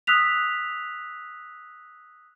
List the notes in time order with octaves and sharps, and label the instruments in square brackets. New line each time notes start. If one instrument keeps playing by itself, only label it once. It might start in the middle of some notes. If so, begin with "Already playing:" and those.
[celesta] D#6 E6 F#6 B6 F7